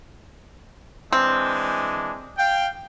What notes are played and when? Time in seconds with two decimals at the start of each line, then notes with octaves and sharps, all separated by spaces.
1.13 E3 G#3 C4 D4
2.38 F5 G5